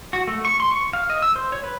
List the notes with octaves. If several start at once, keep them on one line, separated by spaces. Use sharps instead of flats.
F#4
A3
C#6
C6
C#6
F5
D#5
E6
C5
C#5
B4